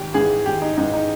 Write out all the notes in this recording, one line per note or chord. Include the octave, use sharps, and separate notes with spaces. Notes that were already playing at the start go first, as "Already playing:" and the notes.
Already playing: G#1 G4
G#2 E3 G#4
G#1 G4
D#4
G#2 E3 D#4
D#4